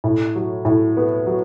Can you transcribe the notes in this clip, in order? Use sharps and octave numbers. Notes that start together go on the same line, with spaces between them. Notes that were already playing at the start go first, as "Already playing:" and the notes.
A2
F#3
A2
B3
F#3